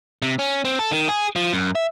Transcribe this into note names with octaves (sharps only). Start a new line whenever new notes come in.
C3
C#4
C4
A4
D#3
G#4
F3
F#2
E5